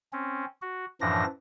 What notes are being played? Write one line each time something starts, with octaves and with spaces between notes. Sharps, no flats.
C4 C#4
F#4
F#2 A2 E3 F3 D4 A#6